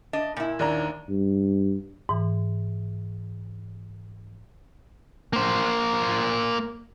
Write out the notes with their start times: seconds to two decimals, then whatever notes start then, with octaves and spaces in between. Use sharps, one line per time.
0.13 D4 D#5
0.36 A#2 E4
0.59 D#2 D4 A#5
1.09 G2
2.09 G#2 E3
5.33 A#3 C5